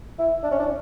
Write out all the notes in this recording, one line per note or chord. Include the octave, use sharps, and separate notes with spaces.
E4
D4
C#4
D4